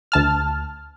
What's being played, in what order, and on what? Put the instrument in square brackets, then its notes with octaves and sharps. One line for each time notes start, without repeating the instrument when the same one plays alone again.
[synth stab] D2 A5 F6